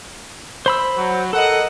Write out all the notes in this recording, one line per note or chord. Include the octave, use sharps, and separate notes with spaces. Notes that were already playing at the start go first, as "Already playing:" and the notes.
C5 B5 E6
F#3
A4 A#4 D#5 F#5